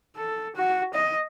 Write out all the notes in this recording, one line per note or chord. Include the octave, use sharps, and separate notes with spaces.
A4
F#4
D#5